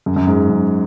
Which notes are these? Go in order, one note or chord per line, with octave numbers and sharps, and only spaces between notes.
F#2
F#2
G#2
F#2